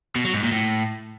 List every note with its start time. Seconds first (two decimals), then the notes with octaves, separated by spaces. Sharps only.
0.16 B2
0.25 F#3
0.34 G#2
0.43 A#2
0.52 A2